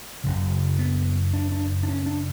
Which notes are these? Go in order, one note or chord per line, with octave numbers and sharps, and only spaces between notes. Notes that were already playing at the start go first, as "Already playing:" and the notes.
F#1 F#2 C#3
B3
D4
D4
D4
C#4
D4